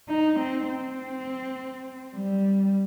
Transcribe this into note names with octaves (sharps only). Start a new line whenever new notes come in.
D#4
C4
C4
G3